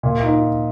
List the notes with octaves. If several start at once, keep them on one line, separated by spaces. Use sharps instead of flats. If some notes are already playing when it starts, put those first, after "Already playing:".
A#2
D#4